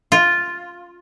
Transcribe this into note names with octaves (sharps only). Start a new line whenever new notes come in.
F4